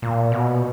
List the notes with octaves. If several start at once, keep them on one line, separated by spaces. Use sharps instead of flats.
A#2
B2